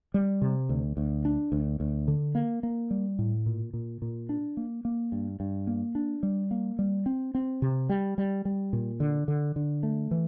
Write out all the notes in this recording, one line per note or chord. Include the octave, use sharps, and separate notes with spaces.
G3
C3
D2
D2
D4
D2
D2
D3
A#3
A#3
G3
A2
A#2
A#2
A#2
D4
A#3
A#3
G2
G2
A#3
D4
G3
A#3
G3
C4
C4
C3
G3
G3
G3
A#2
D3
D3
D3
A3
E3